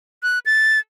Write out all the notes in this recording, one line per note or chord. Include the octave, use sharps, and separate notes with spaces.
F#6
A6